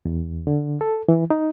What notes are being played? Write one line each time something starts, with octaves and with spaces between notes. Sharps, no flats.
E2
D3
A4
E3
D#4